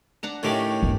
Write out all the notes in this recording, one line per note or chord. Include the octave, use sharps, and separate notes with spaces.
D4 F#5 A#5
A2 D#3 A3 C#4 G4 D5
G1 E2